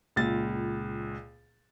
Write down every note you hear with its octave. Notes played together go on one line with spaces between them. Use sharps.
C#2 A#2 A6